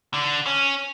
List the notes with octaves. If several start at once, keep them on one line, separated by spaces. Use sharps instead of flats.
D3
C#4